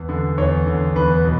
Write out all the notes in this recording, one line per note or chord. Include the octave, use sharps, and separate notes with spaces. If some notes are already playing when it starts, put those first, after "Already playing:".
Already playing: E2
D3
E2 C#5
D3
E2 B4
B2